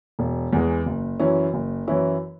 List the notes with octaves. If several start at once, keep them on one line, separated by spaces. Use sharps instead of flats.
E1
E2 E3 G#3
F#1
F#2 E3 C#4 E4
F#1
F#2 E3 C#4 E4